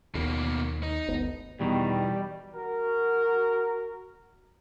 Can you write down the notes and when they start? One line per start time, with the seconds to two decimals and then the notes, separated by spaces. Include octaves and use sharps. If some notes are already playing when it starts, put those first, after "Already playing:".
0.15 D#2 B2 A#3
0.83 D#4
1.08 G1 D2 B3
1.60 E2 B2 D#3 G3
2.54 F#4 A#4